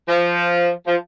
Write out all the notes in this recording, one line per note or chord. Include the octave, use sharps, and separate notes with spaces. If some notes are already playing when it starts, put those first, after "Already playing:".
F3
F3